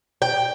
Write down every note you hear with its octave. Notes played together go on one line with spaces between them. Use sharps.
G5